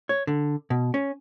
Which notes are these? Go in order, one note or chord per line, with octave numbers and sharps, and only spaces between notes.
C#5
D3
B2
C#4